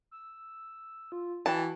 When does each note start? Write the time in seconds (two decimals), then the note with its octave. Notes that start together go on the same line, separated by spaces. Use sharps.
0.11 E6
1.12 F4
1.46 E3 F#4 A5